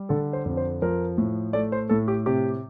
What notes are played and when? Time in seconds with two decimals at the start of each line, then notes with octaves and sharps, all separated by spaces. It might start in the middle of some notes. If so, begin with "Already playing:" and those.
Already playing: G3
0.09 D3 A4
0.33 C5
0.45 F2
0.57 C5
0.82 F3 A#4
1.18 A2
1.53 A3 D5
1.72 C5
1.89 A2 A4
2.08 G4
2.26 C3 G4